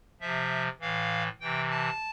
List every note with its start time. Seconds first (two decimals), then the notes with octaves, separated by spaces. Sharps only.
0.20 C3 F3 E5
0.80 A2 E3 F5
1.40 C3 E3 G5
1.70 A5